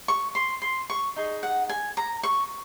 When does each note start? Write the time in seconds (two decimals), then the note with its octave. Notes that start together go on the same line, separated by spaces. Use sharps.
0.08 C#6
0.35 C6
0.62 C6
0.90 C#6
1.16 D#4 G#4
1.43 F#5
1.69 G#5
1.97 A#5
2.23 C#6